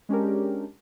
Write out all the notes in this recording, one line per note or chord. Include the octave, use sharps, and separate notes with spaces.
G#3 C#4 D4 G4 A#4